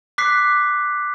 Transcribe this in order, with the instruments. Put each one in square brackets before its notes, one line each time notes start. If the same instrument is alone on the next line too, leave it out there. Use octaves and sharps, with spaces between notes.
[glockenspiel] D6 F#6 B6 C7